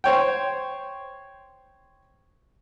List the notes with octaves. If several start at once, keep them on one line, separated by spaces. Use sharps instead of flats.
C5 C#5 G5